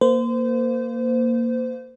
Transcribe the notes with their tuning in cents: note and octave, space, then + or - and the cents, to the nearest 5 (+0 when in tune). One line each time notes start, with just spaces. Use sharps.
A#3 +0 C5 -30